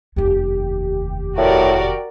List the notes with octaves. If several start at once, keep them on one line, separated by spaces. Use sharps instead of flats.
F1 D#2 G4
A2 F#4 A#4 D5